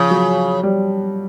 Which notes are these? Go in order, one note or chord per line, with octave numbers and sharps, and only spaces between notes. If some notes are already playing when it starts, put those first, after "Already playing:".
Already playing: C#3 F3
F#3
G3